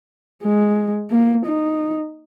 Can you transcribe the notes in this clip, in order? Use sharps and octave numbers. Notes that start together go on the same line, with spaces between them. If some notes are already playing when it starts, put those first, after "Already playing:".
G#3
A#3
D#4